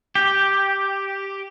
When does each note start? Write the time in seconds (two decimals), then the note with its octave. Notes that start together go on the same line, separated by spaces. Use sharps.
0.15 G4